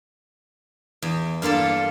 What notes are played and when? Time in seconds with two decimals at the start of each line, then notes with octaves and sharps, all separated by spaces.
1.02 E2
1.42 G2 A#3 F4 A4